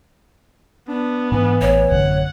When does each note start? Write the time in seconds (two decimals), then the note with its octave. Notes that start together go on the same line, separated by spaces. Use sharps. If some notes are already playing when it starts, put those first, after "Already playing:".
0.89 B3 D4
1.32 G#2 E3 C4 D4
1.61 A1 C#5
1.91 A1 F#2 D3 F#5